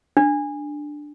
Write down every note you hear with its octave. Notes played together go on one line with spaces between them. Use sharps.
D4